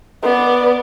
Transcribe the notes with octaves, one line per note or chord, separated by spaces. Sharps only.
B3 D5